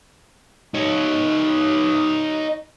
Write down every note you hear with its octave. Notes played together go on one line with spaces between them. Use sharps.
D#4 C#5